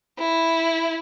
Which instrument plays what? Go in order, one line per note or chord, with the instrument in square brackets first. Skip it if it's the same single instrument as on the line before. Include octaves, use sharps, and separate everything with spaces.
[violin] E4